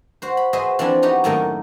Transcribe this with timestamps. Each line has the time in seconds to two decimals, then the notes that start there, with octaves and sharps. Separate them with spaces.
0.22 F#4 C5
0.37 B5
0.53 F#4 G#4 B4 C5 D#5 E5
0.79 E3 F3 C4 D4 E4
1.02 B3 D#4 F#4 G4
1.24 F#2 A2 D#3 A#3 A4 D#5